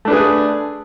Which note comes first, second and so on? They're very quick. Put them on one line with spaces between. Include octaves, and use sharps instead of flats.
A3 D4 B4 G#4